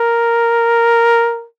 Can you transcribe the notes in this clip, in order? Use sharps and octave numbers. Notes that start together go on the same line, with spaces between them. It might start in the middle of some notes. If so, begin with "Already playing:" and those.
Already playing: A#4